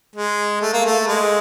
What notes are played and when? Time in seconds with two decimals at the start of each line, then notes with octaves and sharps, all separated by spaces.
0.16 G#3
0.61 A3
0.73 A#3
0.86 A3
1.07 G#3